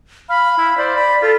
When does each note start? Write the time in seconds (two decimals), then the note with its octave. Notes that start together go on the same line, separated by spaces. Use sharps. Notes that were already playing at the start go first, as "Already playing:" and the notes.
0.29 F5 B5
0.58 E4
0.78 C5 D5
0.96 B5
1.22 F4 A4